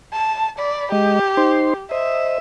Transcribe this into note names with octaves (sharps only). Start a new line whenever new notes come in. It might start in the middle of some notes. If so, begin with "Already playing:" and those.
A5
D5 B5
G#3 G4 D#5
D#4 C5 C6
C5 D#5 E5